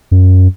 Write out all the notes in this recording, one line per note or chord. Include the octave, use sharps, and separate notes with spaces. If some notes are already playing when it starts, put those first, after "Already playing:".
F#2